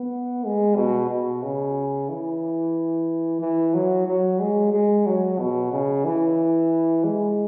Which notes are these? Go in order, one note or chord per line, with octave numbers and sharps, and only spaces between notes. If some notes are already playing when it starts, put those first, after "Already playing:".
Already playing: B3
G#3
B2
B2
C#3
E3
E3
F#3
F#3
G#3
G#3
F#3
B2
C#3
E3
G#3